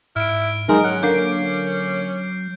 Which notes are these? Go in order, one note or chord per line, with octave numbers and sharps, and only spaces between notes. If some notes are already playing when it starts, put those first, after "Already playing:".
G#2 E4 F6 D7
D#3 F#3 G#3 D#4 A#4
C#4 F#5
D3 A#3 D6 G6 C7